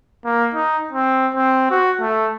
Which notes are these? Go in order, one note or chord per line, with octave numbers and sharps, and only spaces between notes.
A#3
D#4
C4
C4
F#4
A3